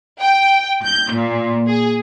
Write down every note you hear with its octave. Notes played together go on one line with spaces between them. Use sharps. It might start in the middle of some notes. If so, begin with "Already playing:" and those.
G5
G6
A#2
G#4